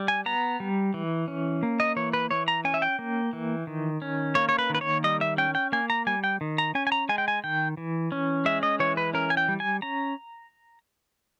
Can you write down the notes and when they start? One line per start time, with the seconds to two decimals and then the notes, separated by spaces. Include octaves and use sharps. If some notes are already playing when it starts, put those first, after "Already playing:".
Already playing: G3
0.08 G#5
0.26 B3 A#5
0.60 G3
0.94 E3
1.28 C#4
1.63 A#3
1.80 D#5
1.96 E3 C#5
2.13 B4
2.31 E3 C#5
2.48 A#5
2.65 C#4 G#5
2.74 E5
2.82 G5
2.99 A#3
3.33 E3
3.67 D#3
4.02 C#4
4.35 A#3 C#5
4.49 C#5
4.59 B4
4.70 D#3 B4
4.81 C#5
5.04 G3 D#5
5.21 E5
5.38 C#4 G5
5.55 G5
5.72 A#3 G#5
5.90 A#5
6.07 G3 G#5
6.24 G5
6.41 D#3
6.58 A#5
6.75 C#4 G#5
6.87 G#5
6.92 A#5
7.09 G#3 G#5
7.18 G5
7.28 G#5
7.44 D#3 G5
7.77 E3
8.12 C#4
8.45 G#3 E5
8.63 D#5
8.80 E3 C#5
8.97 B4
9.14 C#4 A#4
9.30 G#5
9.37 G5
9.48 G3
9.60 G#5
9.82 C#4 A#5